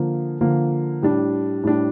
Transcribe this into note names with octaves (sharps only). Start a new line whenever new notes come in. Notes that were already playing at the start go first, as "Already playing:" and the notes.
Already playing: D3 F3 A#3
D3 F3 A#3
A2 G3 D4
A2 G3 D4